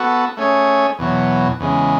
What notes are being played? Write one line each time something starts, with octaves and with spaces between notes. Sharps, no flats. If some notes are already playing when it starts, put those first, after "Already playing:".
Already playing: B3 F#4 A4
A3 C#4 G#4 C#5
E2 B2 F#3
E2 C#3 G#3